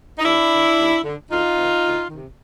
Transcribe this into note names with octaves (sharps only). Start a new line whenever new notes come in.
D#4
D#2 D4 E4
D3
D#2
D3
D2 D#4 F4
C3 D#3
D2
C3 D#3